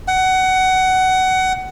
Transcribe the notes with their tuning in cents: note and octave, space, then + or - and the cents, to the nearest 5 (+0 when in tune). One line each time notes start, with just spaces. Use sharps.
F#5 +20